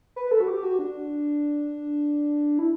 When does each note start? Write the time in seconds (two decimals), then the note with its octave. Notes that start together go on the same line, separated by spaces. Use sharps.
0.16 B4
0.31 A4
0.40 F#4
0.48 G4
0.63 F#4
0.79 D4
2.59 E4